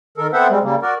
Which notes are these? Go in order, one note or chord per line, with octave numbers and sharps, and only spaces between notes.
D#3 A4 A#4
B3 C4 A4 C5 E5 F#5
G3 G#3 C4
C#3 G3 A#3
F#4 A#4 D5